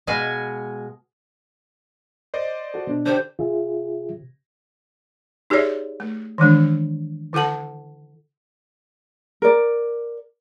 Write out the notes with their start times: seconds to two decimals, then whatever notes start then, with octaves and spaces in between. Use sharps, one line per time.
0.07 B2 G#3 F5 G#5
2.34 C5 D5 D#5
2.74 F#4 A4
2.87 B2 D4
3.06 D3 D4 G4 C5
3.39 C3 F4 G#4 E5
5.50 D#4 G4 G#4 C#5 D5 E5
6.00 A3
6.38 D#3 E3 G#3 D4
7.33 D3 E4 A4 F#5 A5
9.42 A#4 D5